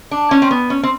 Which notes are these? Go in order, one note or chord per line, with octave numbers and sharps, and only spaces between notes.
D4
C#4
C4
B3
C#4
C4